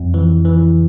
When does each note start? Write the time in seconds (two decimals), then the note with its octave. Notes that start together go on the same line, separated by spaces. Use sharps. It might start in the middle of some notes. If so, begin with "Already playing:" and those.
Already playing: F2
0.14 E3
0.45 E3